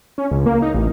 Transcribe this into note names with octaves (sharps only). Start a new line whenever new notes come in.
C#4
C#2
A#3
D#4
A1